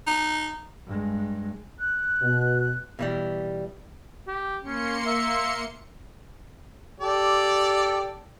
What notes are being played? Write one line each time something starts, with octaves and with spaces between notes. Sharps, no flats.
D#4
G2 G#3
F#6
B2
B2 E3 G3
G4
A#3 C#4 C6 C#7
E5
G4 A4 D5